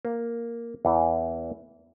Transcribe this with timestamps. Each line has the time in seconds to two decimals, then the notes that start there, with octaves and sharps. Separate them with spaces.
0.05 A#3
0.85 E2 E3